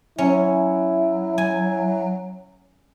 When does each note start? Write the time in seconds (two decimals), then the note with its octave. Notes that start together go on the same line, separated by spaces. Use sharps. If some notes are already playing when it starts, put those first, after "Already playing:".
0.18 F#3 C#4 E4
1.38 G#5